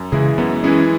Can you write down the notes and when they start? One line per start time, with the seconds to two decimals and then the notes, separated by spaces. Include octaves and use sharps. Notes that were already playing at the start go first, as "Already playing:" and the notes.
Already playing: F#2
0.12 C#3 E3 G#3 E4 G#4
0.38 F#2 B3
0.64 E3 G#3 C#4 E4 G#4